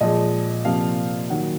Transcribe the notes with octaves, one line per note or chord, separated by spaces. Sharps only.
A#2 F3 G#3 D#5
C3 F3 A#3 F5
D#3 F#3 A#3 F#5